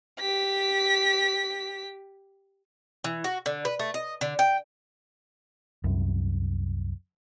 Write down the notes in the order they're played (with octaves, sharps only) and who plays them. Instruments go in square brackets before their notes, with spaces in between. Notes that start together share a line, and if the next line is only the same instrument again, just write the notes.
[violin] G4 B6
[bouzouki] E3
F#4
D3
B4
A3
D#5
D3
G5
[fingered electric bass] C2 F#2